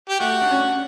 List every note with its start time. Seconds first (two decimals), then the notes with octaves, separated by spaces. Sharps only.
0.09 G4
0.20 A3 F#4
0.41 D4
0.51 C#4